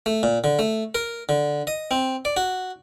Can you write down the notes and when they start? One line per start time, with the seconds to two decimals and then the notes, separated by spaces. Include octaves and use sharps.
0.06 A3
0.23 A#2
0.44 D3
0.59 A3
0.95 A#4
1.29 D3
1.67 D#5
1.91 C4
2.25 D5
2.37 F#4